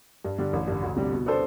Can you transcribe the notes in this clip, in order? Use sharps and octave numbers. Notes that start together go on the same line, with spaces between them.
G2
D3 G3 D4
A1
G2 D3
D2
C3 G3 D4
B2
B3 D4 A4 C5